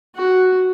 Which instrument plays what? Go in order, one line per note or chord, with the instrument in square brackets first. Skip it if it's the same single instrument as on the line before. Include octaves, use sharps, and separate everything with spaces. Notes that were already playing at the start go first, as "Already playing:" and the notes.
[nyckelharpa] F#4